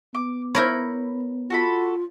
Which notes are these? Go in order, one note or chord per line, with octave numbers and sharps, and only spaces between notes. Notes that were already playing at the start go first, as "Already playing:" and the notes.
B3 D6
E4 A#4 C#5 B5 D6 G6
F4 F#4 A4 B5